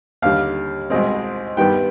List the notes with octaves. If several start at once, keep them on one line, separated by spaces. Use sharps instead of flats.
D#2 D3 G3 F5
C2 B2 G#3 C4
G2 D#3 G3 B3 G5